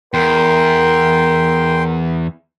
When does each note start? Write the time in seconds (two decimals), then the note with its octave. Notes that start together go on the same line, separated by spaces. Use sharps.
0.14 E2 A#4 G5 C6